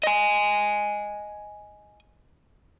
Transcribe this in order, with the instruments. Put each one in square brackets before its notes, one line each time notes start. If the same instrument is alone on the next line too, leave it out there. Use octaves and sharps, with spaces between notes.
[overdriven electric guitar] D#5 G#5